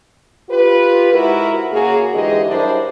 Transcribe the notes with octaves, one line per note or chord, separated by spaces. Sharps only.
F4 G4 B4
G#2 E4 F#4 A#4
C#3 A#3 F#4 G#4
G#2 D3 E3 G4 G#4 D#5
G2 F#3 D4 E4 A#4 C5